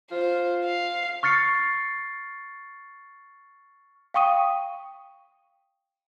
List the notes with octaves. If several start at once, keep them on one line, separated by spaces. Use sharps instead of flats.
F4 C5
F5
C#6 F6 A6 C7 C#7
F5 G5 C#6 D#6 D#7